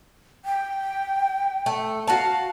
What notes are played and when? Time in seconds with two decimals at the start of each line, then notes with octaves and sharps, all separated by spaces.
0.45 G5
1.66 A3
2.07 F#4 F5 A5